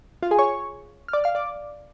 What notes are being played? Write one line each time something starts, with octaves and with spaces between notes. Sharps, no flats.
F4 F5
G#4 G#5
C#5 C#6
F6
D5 D6
F5 F6
D5 D6